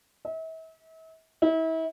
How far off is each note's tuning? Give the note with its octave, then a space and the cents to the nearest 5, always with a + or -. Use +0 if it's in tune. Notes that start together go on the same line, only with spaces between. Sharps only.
E5 -40
E4 -35